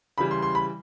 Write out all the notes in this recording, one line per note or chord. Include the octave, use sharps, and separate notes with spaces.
C#3 E3 G3 B5
C6
C6
B5